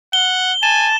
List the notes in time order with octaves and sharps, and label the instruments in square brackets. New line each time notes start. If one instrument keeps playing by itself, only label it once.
[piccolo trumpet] F#5 [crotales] G7
[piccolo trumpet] G#5 [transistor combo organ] A5 [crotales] E7